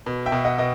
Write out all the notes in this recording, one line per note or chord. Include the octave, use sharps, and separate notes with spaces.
B2
E5 G5
B2
D#5 F#5
B2 D#5